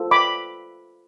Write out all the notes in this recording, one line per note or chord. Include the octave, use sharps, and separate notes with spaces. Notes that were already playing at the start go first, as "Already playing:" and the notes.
Already playing: F4 A4 C5
B5 D6